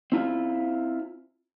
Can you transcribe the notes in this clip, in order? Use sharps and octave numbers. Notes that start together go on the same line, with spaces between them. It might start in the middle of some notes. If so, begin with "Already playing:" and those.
C4 E4 F4